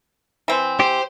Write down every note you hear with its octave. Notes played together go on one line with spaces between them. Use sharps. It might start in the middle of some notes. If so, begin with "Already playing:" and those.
E3 C4
G4 C5